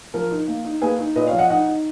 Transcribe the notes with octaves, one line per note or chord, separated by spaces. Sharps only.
F3 A#4
D#4
A#3
D#4
A#3 G#4 B4
D#4
A#2 B4 D#5
C#5 F5
F3
D#5 F#5
D#4 D#5 F#5
D#4